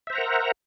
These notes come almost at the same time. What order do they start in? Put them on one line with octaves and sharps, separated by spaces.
E5 C5 A#5 F#5 A#4